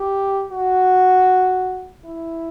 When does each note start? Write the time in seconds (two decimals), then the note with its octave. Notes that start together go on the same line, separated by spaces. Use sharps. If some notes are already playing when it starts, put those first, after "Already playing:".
Already playing: G4
0.52 F#4
2.05 E4